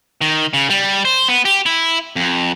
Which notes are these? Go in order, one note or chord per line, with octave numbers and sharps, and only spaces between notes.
D#3
C#3
G3
C5
B3
G4
E4
F2